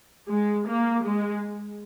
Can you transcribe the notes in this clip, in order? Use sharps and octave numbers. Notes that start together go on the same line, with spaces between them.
G#3
A#3
G#3